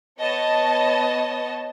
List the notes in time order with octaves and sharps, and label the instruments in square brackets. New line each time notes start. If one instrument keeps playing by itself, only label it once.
[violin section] B3 C#5 D#5 A5